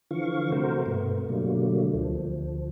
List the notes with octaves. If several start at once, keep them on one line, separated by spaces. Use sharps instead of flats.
D3 E3 F3 F5 C#6
C3 A3 F#4 A#4 C5
G2 B2 A3 B3
B2 D3 F#3 G3 A3 A#3
D2 F3